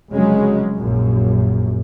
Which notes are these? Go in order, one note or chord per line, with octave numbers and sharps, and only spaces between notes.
F1 C#3 F#3 G#3 C#4
A#1 F#2